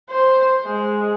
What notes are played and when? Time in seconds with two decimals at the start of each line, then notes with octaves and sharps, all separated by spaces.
0.10 C5
0.64 G#3